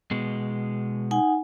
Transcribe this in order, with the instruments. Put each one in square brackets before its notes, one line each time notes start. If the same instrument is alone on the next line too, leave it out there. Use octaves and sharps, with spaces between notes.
[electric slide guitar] B2 G#3 B3
[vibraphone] D#4 F#5 G#5